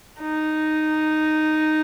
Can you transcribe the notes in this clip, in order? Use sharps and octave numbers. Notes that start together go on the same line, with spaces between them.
D#4